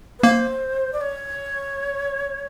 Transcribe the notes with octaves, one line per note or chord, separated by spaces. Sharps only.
B4
A#3 C5
D5
C#5